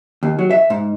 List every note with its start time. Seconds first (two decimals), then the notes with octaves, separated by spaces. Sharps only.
0.23 D#2
0.39 F#3
0.51 E5
0.70 G#2